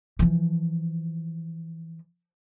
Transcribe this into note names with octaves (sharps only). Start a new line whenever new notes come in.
E3 F3